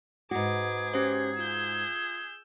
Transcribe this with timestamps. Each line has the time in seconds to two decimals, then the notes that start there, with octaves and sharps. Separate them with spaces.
0.31 G#2 F#4 G#4 B4 D6
0.94 C#4 G4 C5
1.39 F4 E6 G6